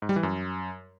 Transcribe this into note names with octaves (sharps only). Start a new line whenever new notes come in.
G#2
G3
E3
F#2